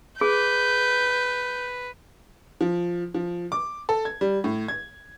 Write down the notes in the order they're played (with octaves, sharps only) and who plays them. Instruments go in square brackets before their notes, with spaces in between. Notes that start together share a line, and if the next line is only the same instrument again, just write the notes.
[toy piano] G#4 [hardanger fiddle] B4 [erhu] G6
[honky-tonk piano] F3
F3
D6
A4
G#6
G3
A2
G#6